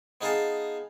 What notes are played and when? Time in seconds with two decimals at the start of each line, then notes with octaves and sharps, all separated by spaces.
0.21 B3 D#4 G#4 F5 G#5 A5